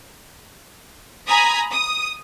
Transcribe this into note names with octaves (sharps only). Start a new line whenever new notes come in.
G#5 A#5 B5 D#6 G#6
D#6